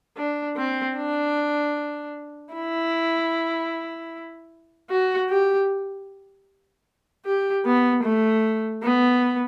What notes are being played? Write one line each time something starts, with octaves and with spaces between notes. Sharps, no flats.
D4
C4
D4
E4
F#4
G4
G4
B3
A3
B3